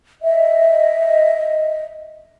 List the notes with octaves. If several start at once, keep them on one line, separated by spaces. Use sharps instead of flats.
D#5 E5